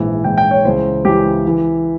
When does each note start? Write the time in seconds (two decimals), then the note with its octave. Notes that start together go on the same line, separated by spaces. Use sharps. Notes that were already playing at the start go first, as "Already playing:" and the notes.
Already playing: A#1 G#2 E3
0.24 A#1 G#2 E3 G5
0.38 G5
0.51 C#5
0.65 C#2 C#3 E3 C5
1.05 C#2 C#3 E3 G4
1.47 E3